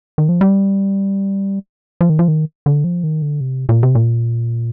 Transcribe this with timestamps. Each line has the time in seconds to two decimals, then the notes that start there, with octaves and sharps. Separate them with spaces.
0.18 D#3
0.29 F3
0.41 G3
2.01 F3
2.10 D#3
2.19 F3
2.28 D#3
2.66 D3
2.84 F3
3.04 D#3
3.22 D3
3.41 C3
3.69 A#2
3.83 C3
3.95 A#2